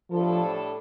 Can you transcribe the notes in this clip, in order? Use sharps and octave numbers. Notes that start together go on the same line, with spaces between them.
A2 F3 G3 D4 A4